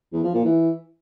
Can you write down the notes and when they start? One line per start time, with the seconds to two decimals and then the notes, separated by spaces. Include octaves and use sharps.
0.13 E2
0.24 F3
0.34 A#2
0.45 E3